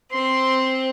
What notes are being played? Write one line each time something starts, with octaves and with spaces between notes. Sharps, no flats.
C4 C6